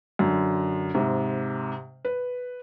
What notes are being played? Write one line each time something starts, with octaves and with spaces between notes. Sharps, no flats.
F#2 D3
G#2 C3
B4